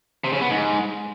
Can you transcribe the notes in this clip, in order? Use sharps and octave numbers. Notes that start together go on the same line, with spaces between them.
C3
C#3
B3
G#2